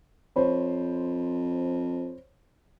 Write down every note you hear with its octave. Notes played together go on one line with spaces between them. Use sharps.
F2 C5 C#5 B5